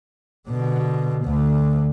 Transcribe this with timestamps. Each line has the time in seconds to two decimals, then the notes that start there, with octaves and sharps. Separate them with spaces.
0.48 B2 D3
1.24 D2 D3